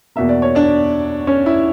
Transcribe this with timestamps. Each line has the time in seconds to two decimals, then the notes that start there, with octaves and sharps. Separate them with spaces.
0.16 E2 B2 A#3 E5
0.29 D5
0.42 C#5
0.55 D4 D5
1.27 C#4 C#5
1.46 E4